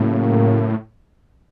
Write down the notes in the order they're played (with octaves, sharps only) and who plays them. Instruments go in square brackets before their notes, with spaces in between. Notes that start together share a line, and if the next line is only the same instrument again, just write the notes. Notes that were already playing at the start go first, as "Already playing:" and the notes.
Already playing: [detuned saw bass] A2 [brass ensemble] C#3 F#3 A#3